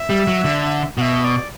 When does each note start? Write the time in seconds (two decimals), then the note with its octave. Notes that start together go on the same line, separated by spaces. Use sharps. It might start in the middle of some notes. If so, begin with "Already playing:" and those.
Already playing: E5
0.10 G3
0.27 F#3
0.44 D3
0.97 B2 F#5
1.01 E5
1.24 D5